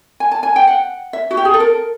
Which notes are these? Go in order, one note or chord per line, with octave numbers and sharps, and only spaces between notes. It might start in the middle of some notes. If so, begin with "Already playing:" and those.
G#5
A5
G#5
G5
F#5
E5
F#4
G4
G#4
A4
A#4